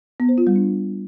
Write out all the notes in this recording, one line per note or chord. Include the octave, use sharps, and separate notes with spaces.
B3
C5
F4
G3
D4